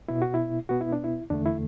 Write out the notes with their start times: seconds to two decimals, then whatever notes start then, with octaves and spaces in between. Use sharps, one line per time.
0.08 B2 B3 E4
0.22 F#4
0.34 E4
0.69 B2 B3 F#4
0.81 E4
0.92 D4
1.04 E4
1.30 E2 D3 A3 D4
1.46 E4